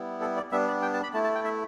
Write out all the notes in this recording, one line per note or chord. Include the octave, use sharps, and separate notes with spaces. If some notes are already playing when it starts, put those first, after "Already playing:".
Already playing: G3 B3 E4
A4
D5
G3 B3 D4 E5
D5
G5
A5
B5
A3 E4 A5
A5
G5
E5